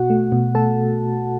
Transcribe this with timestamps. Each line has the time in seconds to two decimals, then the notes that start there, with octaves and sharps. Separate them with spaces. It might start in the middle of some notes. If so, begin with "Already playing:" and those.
Already playing: B2 F#4 F#5
0.10 A3
0.32 B2
0.55 A3 A4 A5